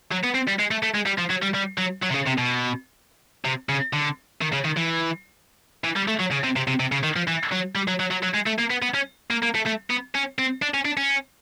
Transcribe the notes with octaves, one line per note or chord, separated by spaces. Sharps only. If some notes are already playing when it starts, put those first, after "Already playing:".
F#3
B3
C4
G3
G#3
A3
A3
G#3
G3
F3
F#3
G3
G3
F#3
F#3
C3
C#3
C3
B2
C3
C#3
D3
D#3
C#3
D#3
E3
E3
G3
A3
F#3
C#3
C3
C3
C3
C3
C#3
D#3
F3
E3
F#3
G3
F#3
F#3
F#3
F#3
G#3
A3
A#3
B3
B3
C#4
A#3
A#3
A3
A3
B3
C#4
C4
D4
C#4
D4
C#4